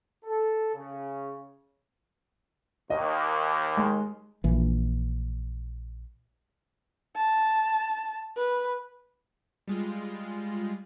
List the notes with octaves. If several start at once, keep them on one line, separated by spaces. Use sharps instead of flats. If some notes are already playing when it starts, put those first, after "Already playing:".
A4
C#3
D#2 D#5
G#3
A#1 E3
A5
B4
G3 G#3 F4